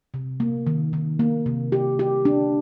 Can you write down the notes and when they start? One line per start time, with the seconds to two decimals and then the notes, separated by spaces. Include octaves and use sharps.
0.14 C3
0.40 A#3
0.67 D#3
0.93 D#3
1.19 A#3
1.46 C3
1.72 G4
1.99 G4
2.25 D4